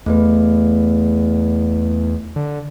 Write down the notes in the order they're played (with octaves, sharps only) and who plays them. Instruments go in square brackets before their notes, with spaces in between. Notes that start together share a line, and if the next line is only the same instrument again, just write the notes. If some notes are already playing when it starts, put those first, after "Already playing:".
[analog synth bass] E2 [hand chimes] A3 B3 B4
[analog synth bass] D3